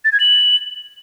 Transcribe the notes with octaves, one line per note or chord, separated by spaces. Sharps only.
A6
G#6
F#7